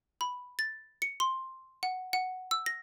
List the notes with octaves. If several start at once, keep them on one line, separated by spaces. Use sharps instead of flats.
B5
A6
C#7
C6
F#5
F#5
E6
A#6